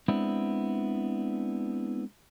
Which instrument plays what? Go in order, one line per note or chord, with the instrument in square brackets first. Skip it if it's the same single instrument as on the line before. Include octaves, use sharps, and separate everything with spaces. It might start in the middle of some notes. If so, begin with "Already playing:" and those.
[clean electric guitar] G#3 B3 C4 D4 E4